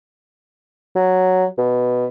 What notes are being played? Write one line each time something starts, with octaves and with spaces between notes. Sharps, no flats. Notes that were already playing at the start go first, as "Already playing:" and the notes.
F#3
B2